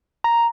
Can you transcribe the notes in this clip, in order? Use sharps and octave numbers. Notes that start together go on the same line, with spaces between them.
A#5